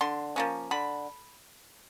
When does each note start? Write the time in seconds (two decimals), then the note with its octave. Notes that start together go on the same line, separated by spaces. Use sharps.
0.01 D3 C6
0.36 F3 A#3 C#4
0.71 D3 B5